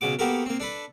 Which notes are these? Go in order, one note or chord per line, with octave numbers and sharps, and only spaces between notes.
B1 C#3 F#4 D6
A#3 B3 F#4 G4 A4 A#4
A#3 C4
D4 A4 B4